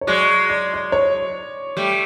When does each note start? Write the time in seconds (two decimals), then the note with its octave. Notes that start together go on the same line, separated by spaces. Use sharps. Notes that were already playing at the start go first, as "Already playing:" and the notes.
0.01 C#5
0.07 F#3 G#3 D5
0.49 D5
0.74 D5
0.92 C#5
1.77 G3 A3